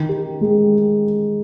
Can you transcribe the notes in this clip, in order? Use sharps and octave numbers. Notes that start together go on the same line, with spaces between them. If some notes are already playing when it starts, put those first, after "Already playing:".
Already playing: D#3
G4
G#3